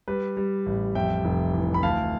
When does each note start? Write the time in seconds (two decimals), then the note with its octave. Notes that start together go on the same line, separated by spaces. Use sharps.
0.08 G3 B4
0.37 G3
0.66 A1
0.95 F2 E5 G5
1.25 F1
1.54 E3
1.74 B5
1.83 D2 F5 A5